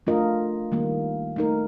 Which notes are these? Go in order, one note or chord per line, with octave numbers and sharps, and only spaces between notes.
A3 D4 F4 A#4 D#5
D#3 G3 A#3
A3 D#4 A#4